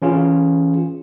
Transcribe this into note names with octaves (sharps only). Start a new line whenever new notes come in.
E3 C#4 F4 G#4